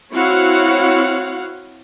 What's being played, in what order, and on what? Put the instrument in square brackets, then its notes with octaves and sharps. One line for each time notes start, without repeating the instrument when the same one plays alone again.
[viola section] C4 E4 F#4 C#5 F5 F#5